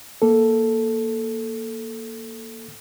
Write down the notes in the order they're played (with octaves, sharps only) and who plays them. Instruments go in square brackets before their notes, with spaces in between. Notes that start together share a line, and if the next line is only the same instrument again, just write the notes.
[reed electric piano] A#3 A4